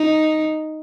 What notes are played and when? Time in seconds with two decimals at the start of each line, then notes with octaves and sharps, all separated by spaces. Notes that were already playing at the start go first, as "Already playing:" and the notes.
Already playing: D#4